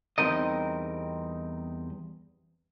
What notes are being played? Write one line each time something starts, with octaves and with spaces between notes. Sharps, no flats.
E2 G3 C4 D#4 A#4 D#5